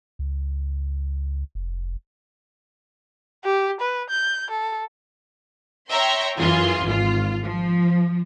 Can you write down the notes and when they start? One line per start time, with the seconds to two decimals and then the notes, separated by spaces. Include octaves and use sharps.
0.19 C#2
1.55 F1
3.45 G4
3.81 B4
4.10 G6
4.50 A4
5.89 C#5 E5 G5 A#5 C6
6.38 F#2 E3 F4 G#4 C6
6.83 G#1 F4
7.43 F3